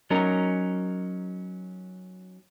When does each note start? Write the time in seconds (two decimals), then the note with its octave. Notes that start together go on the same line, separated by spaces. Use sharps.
0.11 F#3 C#4 D#4 A#4